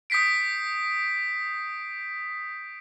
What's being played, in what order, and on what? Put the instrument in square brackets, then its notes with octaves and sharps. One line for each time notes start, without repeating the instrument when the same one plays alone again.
[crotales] D#6 G6 B6 C7 D7